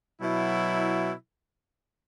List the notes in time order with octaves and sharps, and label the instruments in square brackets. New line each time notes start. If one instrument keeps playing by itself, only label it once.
[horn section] B2 F#3 E4